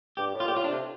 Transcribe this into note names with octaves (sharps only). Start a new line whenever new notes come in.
G2 G4
A2
F4
A#2 G4
A2 F4
D4
C3